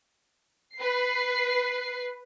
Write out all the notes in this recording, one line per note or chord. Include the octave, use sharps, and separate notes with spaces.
B4 C7